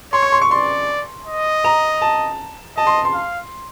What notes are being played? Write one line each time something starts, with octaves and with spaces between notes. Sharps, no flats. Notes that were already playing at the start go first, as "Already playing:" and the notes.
C#5 C6
C#6
C6
C#6
D5 C6
D#5
A#5
A5
D#5 A5
C6
C6
F5